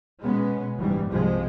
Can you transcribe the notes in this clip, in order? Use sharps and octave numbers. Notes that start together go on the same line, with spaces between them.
B2 G#3 B3 C#4
F#1 G#2 E3 G3
C2 G2 C3 F3 G#3